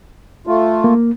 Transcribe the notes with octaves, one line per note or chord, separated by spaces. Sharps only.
A3 F4
A#3